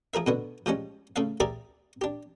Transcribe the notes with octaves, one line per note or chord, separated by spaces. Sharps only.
F3 G#4 A#4 E5
B2 D3 B3
F3 G3 G#3 C#4
C#3 A3 E5 F5
G4 G#4 A#4 D5 E5 D6
D4 G4